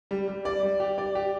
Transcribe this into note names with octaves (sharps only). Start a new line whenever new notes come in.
G3
G3
D5
G3
G4
D5
G4